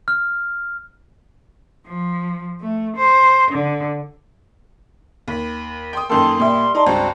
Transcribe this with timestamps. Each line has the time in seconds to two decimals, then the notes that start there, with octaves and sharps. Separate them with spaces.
0.08 F6
1.85 F3
2.61 A3
2.97 C5
3.50 D3
5.28 D#2 B5
5.93 G5 C6 D#6
6.09 F#2 D#3 A#3 A4 G5 C6
6.40 A#2 G3 E5
6.75 D#4 D5 A5 A#5 C6
6.87 C#2 G2 C4 F#4